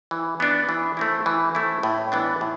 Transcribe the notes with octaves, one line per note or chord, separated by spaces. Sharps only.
E3
B3 D4
E3
A3 C4 E4
E3
A3 C4 E4
A2
E3 B3 D4
A2